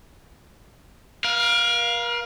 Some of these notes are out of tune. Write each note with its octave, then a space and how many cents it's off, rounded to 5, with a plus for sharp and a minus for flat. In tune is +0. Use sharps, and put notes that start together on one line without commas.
A#4 +40 F5 +0